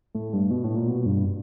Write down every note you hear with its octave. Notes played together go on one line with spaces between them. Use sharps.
A2
G2
B2
A2
A#2
B2
G2